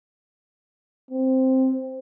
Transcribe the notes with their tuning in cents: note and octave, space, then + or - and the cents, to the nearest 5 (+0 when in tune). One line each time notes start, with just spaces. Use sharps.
C4 +0